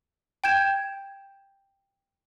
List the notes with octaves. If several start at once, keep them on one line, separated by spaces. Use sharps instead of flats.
G5 G6 G#6 E7